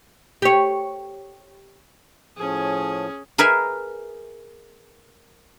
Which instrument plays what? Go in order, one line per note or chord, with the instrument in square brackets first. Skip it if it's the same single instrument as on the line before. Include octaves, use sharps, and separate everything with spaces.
[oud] G4 C#5
[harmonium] A2 F3 [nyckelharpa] C#4 G#4
[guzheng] G#4 A#4 B4 E5 G#5